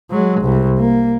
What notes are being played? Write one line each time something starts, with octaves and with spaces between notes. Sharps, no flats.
F#3 G#3
C2
A#3